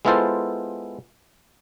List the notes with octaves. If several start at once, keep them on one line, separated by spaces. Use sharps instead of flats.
G#3 B3 E4 F4 A4 C5